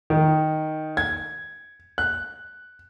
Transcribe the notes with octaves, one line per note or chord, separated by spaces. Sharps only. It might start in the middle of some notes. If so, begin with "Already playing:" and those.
D#3
G#6
F#6